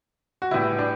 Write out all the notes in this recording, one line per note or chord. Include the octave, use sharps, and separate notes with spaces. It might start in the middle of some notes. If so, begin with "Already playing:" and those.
F#4
A2 E3 G3 E4
D4